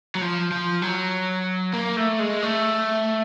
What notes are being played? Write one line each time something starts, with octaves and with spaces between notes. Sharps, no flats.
F#3
F3
F3
F#3
A#3
A3
G#3
A3